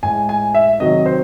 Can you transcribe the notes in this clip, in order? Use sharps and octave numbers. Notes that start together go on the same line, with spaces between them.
A2 G#3 G#5
G#5
E5
C3 D#3 F#3 D#5
C5